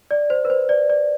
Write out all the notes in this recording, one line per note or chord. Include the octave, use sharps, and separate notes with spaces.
D5
C5
B4
C5
D5
D5